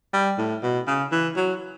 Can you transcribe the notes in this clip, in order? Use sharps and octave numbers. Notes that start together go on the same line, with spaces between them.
G3
A2
B2
C#3
E3
F#3